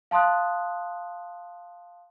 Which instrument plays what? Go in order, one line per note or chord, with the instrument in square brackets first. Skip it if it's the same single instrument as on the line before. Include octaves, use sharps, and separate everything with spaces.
[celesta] F5 A5 C6 D#6 F#6